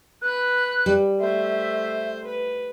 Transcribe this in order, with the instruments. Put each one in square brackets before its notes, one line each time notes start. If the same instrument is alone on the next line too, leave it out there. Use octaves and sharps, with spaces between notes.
[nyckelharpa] B4 B5 [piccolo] F#6
[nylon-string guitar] G3
[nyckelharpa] A3 C5 [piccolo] E5
[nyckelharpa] B4